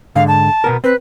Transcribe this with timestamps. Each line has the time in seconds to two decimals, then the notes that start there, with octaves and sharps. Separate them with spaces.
0.15 G#2 D3 F5
0.28 A5
0.64 B2 B3 A#4
0.84 C4 B4